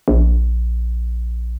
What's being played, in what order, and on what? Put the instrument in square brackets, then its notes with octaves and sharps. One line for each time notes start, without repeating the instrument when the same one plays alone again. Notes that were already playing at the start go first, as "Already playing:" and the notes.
[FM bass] A#1